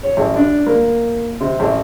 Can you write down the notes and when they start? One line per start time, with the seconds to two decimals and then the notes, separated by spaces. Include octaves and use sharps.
0.03 C#5
0.17 A1
0.36 D4
0.66 A#3
1.40 C3
1.60 A1